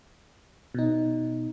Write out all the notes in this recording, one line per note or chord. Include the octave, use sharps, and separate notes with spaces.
B2 D#4